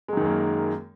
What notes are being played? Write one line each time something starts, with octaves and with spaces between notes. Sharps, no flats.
F#2 D#3 F#3 G#3 A#3